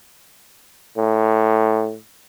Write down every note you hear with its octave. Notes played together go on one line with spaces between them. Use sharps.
A2